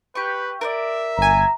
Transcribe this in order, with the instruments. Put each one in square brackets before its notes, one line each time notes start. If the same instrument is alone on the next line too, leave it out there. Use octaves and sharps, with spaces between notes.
[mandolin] G4 C#6 [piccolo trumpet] B4
[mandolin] A#4 B4 D5 [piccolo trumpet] E5
[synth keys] G1 G#5 [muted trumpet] A#5